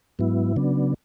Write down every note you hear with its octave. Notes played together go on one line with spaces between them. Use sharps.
G#2 F#3 B3 E4
C#3 F#3 B3 D4